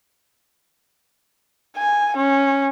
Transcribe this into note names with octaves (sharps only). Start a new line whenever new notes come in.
G#5
C#4